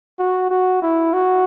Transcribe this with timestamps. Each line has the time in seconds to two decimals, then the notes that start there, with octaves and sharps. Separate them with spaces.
0.19 F#4
0.50 F#4
0.82 E4
1.13 F#4